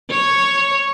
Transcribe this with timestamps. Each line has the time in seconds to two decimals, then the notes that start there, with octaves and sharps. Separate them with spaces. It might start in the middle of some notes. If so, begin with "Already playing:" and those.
0.10 C#5